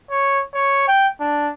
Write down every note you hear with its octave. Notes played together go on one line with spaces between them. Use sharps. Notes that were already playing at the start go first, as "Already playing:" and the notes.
C#5
C#5
G5
D4